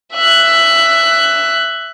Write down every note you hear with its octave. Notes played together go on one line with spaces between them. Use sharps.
E5 F#6